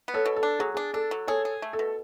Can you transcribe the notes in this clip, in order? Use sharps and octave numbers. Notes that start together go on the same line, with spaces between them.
B3
A4 C#5
B2
A4
D4
F#3 G#4
D4 G#4
D4 A4
F#3
G#4 A4 C#5
G#4
A3
A4
B2